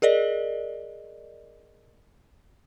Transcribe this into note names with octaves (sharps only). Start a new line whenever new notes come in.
G#4 A#4 D5 D#5